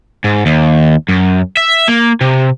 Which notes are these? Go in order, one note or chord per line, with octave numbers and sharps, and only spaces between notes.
G#2
D#2
F#2
E5
A#3
C3